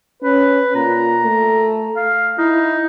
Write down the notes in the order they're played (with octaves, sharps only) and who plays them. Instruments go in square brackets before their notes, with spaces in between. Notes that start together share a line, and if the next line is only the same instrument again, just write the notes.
[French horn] C#4 [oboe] B4
[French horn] A#2 [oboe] A#5
[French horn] A3
[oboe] F5
[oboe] D#4 [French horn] E4